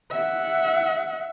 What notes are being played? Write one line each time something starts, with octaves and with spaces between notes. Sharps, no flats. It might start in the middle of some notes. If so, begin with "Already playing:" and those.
E5 F#5